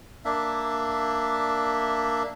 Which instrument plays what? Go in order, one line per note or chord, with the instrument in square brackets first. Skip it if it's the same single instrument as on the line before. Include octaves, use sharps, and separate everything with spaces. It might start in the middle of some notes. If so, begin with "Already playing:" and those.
[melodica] A#3 D4 E5